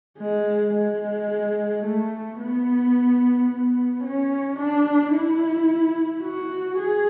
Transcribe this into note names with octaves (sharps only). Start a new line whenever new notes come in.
G#3
G#3
A3
B3
B3
C#4
D4
E4
F#4
G#4